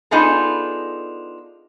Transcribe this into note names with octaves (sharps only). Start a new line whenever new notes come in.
B3 D4 D#4 F4 G#4 A4